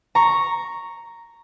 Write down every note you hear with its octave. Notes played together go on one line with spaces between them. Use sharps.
A#5 C#6